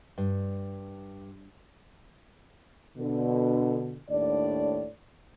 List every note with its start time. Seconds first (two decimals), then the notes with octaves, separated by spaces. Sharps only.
0.18 G2
2.98 B2 D3
4.09 D#2 A2 D4 D5